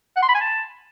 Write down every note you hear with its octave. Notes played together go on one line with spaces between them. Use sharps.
F#5
C6
B5
G#5
A5